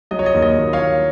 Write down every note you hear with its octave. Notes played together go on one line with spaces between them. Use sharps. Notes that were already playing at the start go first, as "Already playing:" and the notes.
F#3 D#5
C#5
D#5
D#2
D#5
D#2
C#5 F5
D#2